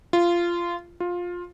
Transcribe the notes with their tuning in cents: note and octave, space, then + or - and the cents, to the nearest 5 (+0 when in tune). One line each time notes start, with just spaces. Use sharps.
F4 -15
F4 +15